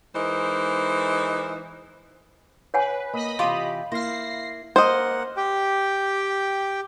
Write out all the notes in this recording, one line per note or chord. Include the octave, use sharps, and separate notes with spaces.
E3 G#3 D#4 A#4 C5
B4 C#5 F#5 G#5
A#3 D#5 B5
C3 E3 F4 G4 D#6
A#3 E4 C5 F5 A#6 C7
A#3 C5 D#5 F#5
G4 G5